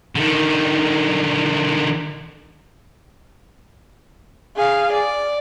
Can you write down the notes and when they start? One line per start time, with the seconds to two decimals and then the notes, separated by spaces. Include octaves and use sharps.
0.15 D3 D#3
4.56 G#4 F5
4.93 D5